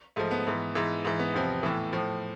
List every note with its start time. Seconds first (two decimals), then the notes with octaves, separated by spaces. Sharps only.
0.16 G#2 F3 A3
0.31 B3
0.47 G#2 E3
0.75 G#2 E3
1.04 G#2 E3
1.20 B3
1.34 E2 C3 F3
1.63 A2 E3
1.93 A2 F3